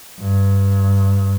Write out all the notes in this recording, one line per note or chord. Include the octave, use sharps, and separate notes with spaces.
G2